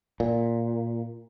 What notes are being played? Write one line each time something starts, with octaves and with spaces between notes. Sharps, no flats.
A#2